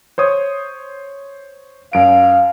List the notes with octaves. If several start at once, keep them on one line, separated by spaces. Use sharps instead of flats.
C5 C#5 D#6
F#2 F5 D7